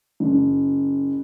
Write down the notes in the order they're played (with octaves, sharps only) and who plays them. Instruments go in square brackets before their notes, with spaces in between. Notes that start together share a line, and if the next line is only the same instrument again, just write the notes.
[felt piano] F#1